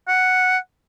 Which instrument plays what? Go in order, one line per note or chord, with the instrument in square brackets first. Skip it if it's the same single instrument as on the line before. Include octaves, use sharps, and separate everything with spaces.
[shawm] F#5